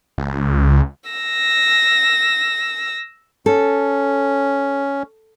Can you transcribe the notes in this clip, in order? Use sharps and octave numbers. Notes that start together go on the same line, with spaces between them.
C#2
E6 A#6
C#4 A4